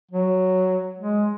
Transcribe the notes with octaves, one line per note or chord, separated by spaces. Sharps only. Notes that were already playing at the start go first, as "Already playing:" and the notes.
F#3
G#3